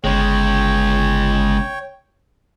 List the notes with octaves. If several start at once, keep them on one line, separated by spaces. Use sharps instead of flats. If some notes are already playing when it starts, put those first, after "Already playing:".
G1 C#3 G#3 C#5 G5